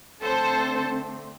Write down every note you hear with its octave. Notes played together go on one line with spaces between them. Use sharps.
D3 A3 C4 A4 C5